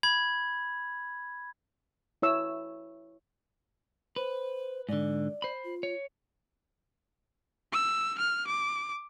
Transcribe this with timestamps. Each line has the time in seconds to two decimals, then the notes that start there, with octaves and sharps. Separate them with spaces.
0.03 B5 G#6
2.22 E4 C#5 E6
4.16 B4 C5
4.89 G#2 D3 D5
5.42 C5 B5
5.65 F4
5.83 C#5
7.72 E6
8.18 F6
8.47 D6